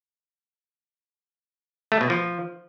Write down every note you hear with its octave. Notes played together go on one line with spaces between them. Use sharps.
A3
B2
F3